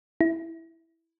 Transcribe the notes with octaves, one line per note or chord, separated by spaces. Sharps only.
E4